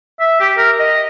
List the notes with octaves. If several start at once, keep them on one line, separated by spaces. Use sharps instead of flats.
E5
G4
A#4
D#5